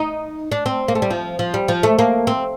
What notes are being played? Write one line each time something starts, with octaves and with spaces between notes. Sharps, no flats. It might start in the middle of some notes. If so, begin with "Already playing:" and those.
Already playing: D#4
D4
C4
A#3
A3
G3
F3
F3
G3
F3
A3
A#3
C4